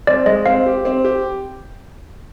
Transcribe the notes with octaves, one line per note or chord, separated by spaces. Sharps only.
C4 D5
G#3 D#5
C4 F5
G4
C4
G4